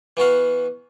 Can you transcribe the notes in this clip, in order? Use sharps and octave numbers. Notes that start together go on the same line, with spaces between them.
E3 B3 F#4 F5